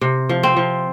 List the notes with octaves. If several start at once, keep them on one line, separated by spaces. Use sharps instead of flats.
C3
F3
C4
F3